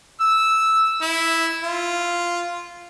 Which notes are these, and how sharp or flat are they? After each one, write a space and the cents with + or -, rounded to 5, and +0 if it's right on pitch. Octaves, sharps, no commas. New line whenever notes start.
E6 -5
E4 -5
F4 -5